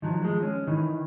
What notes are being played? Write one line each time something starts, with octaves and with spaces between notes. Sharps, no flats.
D#3 F3 F#3
F3 G#3
C#4
D#3 E3